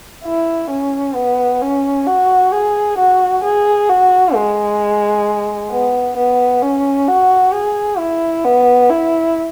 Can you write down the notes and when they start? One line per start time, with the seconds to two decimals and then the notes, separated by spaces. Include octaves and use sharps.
0.25 E4
0.70 C#4
1.15 B3
1.62 C#4
2.07 F#4
2.53 G#4
2.98 F#4
3.44 G#4
3.89 F#4
4.35 G#3
5.71 B3
6.17 B3
6.62 C#4
7.08 F#4
7.54 G#4
7.98 E4
8.44 B3
8.90 E4